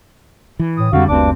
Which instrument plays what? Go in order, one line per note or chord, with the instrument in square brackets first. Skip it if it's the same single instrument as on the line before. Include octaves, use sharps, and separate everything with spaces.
[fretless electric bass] E3
[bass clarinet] A2 [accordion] D#6
[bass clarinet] F2 [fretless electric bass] D3 G3 [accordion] F#4 F5
[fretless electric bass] F#1 C4 [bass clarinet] D2 [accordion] G2 D4 D6